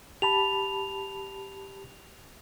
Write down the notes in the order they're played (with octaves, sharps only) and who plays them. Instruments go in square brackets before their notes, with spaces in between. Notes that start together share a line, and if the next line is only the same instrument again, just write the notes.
[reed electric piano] G4 A5 B5 [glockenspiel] F7